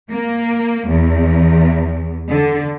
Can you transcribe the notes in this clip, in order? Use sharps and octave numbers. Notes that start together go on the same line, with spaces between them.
A#3
E2
D3